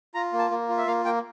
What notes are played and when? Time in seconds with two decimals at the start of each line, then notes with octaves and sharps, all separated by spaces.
0.15 F4 A#5
0.33 A#3
0.39 A5
0.51 A#3
0.69 F4
0.78 E5
0.87 A#3 F5
1.05 A#3 G5